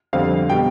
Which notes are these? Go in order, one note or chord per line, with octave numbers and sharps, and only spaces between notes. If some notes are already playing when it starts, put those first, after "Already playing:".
F2 D3 G3 C4 F5
B2 G3 G5